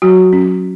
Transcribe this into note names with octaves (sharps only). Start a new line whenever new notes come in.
F#3 F#4
C#4